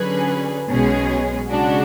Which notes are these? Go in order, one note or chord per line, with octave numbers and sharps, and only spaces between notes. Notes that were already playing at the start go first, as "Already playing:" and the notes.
Already playing: D3 F#3 C#4 G#4 B4
B1 B2 G#3 C#4 G#4
C#3 G#3 D4 F#4